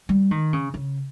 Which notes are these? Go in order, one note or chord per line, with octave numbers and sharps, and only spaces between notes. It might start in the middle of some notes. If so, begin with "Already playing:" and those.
G3
D#3
C#3
C#3